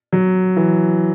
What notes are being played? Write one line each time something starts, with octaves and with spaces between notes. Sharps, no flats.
F#3
E3